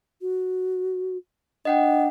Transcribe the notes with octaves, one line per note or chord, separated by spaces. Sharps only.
F#4
D4 D#5 F#5 G5